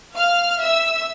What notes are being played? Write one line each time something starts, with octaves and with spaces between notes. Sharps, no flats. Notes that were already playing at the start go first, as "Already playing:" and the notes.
F5 F6
E5 E6